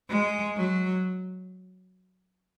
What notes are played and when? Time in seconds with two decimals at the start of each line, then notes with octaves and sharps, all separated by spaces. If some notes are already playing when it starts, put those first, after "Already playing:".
0.10 G#3
0.57 F#3